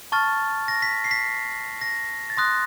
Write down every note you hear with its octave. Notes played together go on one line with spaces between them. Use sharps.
A5 C#6 F6 A6
A#6
B6
C7
B6
A#6
A6
C6 D#6 F#6 A#6